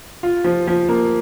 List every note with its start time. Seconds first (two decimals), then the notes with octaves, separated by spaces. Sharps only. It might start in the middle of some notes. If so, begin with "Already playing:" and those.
0.23 F4
0.44 F3
0.67 F3
0.89 A#3